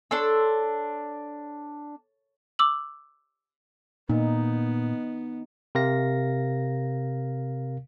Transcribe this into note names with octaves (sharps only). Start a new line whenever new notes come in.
D4 A4 C#5 C6 E6 C#7
D6 E6 F#7
A#2 B3 D#4
C3 A#4 F5 A#6